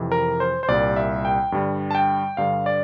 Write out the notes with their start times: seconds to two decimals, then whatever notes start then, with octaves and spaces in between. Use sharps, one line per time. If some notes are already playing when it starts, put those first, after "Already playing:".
Already playing: F2 C3 E3
0.12 A#4
0.40 C5
0.63 C5
0.68 C2 A#2 G3 D5
0.96 E5
1.25 G5
1.52 G2 D3 G3
1.91 A5
1.95 G5
2.37 G2 D3 G3 F5
2.66 D5